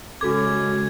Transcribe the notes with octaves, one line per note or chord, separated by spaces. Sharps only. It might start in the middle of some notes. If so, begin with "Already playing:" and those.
C#3 G#3 C#4 F#4 A4 D6 G#6